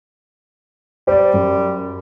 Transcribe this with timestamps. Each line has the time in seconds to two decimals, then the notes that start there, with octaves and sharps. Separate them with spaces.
1.07 G3 C5 D5
1.34 F#2